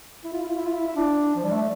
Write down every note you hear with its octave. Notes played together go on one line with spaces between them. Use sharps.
E4
F4
E4
F4
E4
F4
E4
E4
D4
F3
G3
A3